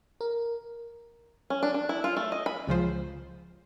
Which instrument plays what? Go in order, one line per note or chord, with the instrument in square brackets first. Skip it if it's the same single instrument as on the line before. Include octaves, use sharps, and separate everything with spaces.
[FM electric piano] A#4
[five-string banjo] C#4
D4
D4
E4
F4
A3
D#5
B5
[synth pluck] C#2 C#3 F3 C5